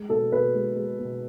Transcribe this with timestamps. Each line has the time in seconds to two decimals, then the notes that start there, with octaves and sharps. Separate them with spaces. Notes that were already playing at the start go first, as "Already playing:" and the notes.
Already playing: G#3
0.09 B2 A4
0.32 B2 B4
0.54 G#3
0.76 G#3
0.99 B2